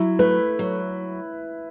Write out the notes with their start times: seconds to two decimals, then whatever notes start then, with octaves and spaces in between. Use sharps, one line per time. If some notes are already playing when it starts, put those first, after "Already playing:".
Already playing: F#3 E4
0.19 A3 B4
0.59 F#3